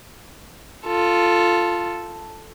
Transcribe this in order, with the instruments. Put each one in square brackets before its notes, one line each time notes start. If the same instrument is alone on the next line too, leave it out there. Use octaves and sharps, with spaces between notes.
[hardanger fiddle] F4 A4